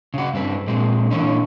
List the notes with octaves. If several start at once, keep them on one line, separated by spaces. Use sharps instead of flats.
C#3 F#4
G2 C4 G4 B4
A#2 G#3 C4
A#2 D3 E3 A#3 C#4 D#4